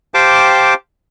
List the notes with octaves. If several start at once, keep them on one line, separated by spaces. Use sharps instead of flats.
G4 C5 F5 G5 A5 D6